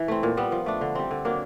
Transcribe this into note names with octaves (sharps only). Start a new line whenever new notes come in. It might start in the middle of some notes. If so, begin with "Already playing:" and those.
Already playing: E3
A3 C4
A#2
G3 B3
F3
A3 D4
D3
G3 C4
D3
F#3 A#3 D4